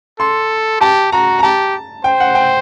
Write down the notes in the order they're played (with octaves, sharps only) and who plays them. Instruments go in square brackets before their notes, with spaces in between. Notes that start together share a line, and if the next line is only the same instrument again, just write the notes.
[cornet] A4 [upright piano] C6
[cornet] G4 [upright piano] A5
[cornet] F#4 [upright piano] A#5
[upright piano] A#5
[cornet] G4 [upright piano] A5
[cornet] C5 [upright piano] G5
[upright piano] F#5
G5